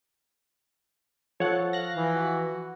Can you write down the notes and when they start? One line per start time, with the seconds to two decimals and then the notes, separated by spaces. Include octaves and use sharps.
1.40 F3 A4 C#5 F#5
1.73 F5 F#6 A#6
1.95 E3
2.16 F#4